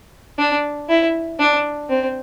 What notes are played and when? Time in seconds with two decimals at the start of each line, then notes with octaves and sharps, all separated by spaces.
0.39 D4
0.89 E4
1.40 D4
1.89 C4